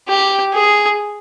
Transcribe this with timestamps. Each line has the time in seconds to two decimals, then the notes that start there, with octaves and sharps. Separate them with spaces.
0.08 G4
0.54 G#4